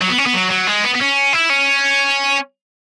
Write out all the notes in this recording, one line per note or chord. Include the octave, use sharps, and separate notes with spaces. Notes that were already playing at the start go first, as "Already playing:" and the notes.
F#3
B3
C#4
B3
F#3
F#3
G#3
B3
B3
C#4
E4
C#4